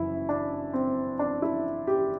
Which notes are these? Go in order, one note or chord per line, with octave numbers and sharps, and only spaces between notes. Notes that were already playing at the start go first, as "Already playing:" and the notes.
Already playing: F#1 F#2 E3 E4
D4
C4
D4
E4
G4